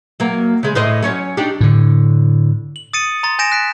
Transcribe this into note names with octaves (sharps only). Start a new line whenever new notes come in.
F#3 A#3
C#3 G#3
A2 C5 D#5
F#3 C#4 C#5
D4 D#4 G4
A2 D3
F#7
D#6 A6 C#7 D#7
A#5 C6 A6
G#5 G6 A6 A#6 D7 E7
F#6 B6 D7